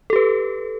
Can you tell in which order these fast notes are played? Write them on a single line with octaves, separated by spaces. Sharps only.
A4 G4 B4